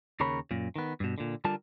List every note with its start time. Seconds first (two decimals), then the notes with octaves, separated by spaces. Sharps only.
0.20 D#2 C#3 A#4 C#5 B5
0.51 F#2 A#2
0.76 D#3 B3
1.00 G2 B2
1.18 A#2 D3
1.45 D3 G3 F4 A#4 A5